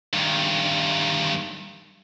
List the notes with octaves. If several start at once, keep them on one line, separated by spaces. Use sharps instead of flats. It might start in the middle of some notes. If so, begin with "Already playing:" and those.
G2 D#3